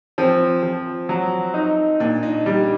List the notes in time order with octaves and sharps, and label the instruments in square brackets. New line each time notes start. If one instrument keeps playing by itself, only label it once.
[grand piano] F3 [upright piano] C4
[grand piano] F3
F#3
D#4
[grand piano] A#2 [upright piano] D4
[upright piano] D#4
[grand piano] G3 [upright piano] D4